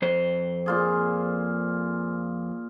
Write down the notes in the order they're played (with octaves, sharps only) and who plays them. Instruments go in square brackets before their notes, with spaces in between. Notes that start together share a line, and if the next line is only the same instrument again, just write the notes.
[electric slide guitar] F2 C5
[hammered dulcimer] A#2 F4 G#4